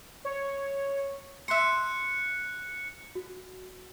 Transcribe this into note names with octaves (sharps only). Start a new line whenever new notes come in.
C#5
E5 C6 F#6 C#7
F#4